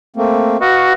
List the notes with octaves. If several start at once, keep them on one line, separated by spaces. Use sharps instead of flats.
A3 A#3 C4
F#4 B4 D#5 F5